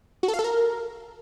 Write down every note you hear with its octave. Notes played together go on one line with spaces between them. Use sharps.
F#4
A4
F5
A4
A#4